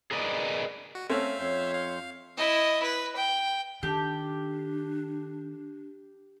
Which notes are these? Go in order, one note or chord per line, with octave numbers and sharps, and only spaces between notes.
G#4 A#4 B4 D5 D#5
F#4
A3 C4 C#4 E5 F5
F2 C#5 C6 G6
F5
E4 D#5
B4
G5
D#3 D4 G4 A4